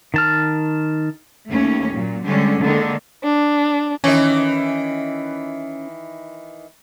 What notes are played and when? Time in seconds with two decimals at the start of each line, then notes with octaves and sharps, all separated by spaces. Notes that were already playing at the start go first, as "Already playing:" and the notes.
0.14 D#3 A5 F6
1.48 D#2 A3 A#3 C#4
1.90 A#2 F#3
2.23 D3 G3 G#3 C#4
2.61 D3 D#3 G#3 A#3
3.24 D4
4.04 D#3 E3 C#4